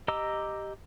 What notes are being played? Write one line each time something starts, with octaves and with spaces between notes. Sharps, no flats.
G4 D#5 A#5 D6 E6